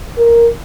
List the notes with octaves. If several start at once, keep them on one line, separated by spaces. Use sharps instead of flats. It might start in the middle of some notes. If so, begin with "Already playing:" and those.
A#4